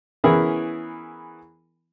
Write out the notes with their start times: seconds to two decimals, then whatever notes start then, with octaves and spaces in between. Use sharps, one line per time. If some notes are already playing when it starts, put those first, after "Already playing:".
0.24 E3 B3 C#4 E4 G#4 A#4